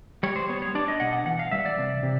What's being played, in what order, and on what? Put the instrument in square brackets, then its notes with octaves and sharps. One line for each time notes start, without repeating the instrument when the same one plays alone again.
[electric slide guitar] G3 C#5
C5
B3 C#5
C#5
D4 D5
D#5
B2 F#5
F#5
E3 F#5
F5
G3 E5
D5
C3
C3